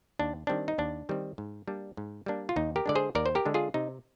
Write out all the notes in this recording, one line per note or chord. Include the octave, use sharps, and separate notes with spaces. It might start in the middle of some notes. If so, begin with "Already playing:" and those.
D#2 D4
D#3 G3 C4 D4
D#4
D#2 D4
D#3 G3 C4
G#2
G3 A#3 D4
G#2
G3 A#3 D4
F4
D#2 D#4
G4 A#4
D3 G#3 D4 D5
G#4 C5
D#2 A#4 D5
C5
G4 A#4
D3 G#3 D4
F4 G#4
C3 D#4